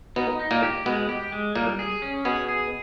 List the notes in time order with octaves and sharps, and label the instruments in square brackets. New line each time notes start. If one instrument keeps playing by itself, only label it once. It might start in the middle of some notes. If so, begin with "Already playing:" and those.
[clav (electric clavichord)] B2 B3 [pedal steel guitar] D#4
[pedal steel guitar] D#4
[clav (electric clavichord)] A#2 A#3
[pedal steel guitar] G4
[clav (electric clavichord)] B2 B3 [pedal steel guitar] G#3
[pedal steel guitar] G4
G#3
[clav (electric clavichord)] A#2 A#3 [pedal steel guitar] G3
[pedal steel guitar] G#4
C#4
[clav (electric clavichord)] B2 B3 [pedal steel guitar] G#4
[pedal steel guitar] G#4